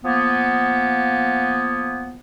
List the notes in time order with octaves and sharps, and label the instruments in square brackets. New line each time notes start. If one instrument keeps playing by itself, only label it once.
[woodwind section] F3 A#3 B3